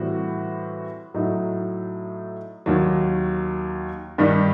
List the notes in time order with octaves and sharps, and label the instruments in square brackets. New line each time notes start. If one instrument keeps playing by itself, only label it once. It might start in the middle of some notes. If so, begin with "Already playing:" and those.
Already playing: [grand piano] A2 E3 G3 C4 F#4
A2 F#3 A3 D#4
D#2 D#3 F#3
G2 D#3 G3